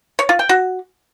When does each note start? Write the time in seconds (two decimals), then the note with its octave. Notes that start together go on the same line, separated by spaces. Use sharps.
0.19 C#5
0.29 F4
0.39 G5
0.49 F#4